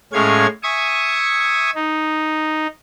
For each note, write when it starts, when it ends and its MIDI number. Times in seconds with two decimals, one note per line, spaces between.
0.13 0.46 45
0.13 0.46 56
0.13 0.46 61
0.13 0.46 73
0.13 0.46 77
0.13 0.46 92
0.63 1.70 76
0.63 1.70 80
0.63 1.70 85
0.63 1.70 87
1.75 2.67 63